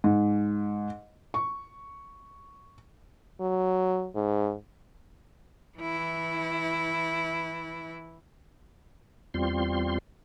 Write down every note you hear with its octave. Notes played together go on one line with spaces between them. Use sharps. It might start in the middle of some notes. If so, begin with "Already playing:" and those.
G#2
C#6
F#3
G#2
E3 E4
E2 G3 C4 F4 C6